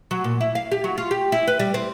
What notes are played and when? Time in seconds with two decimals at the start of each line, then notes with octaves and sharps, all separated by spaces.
0.11 F#3
0.24 A#2
0.41 E4
0.55 F5
0.72 G4
0.84 F#3
0.98 F4
1.11 G4
1.32 E4
1.47 B4
1.59 G3
1.74 C4